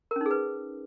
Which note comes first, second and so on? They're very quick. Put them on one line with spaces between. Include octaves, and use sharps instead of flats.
A#4 C#4 D#4 G#4 B4